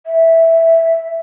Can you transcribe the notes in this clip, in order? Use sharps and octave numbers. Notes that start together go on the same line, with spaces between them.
E5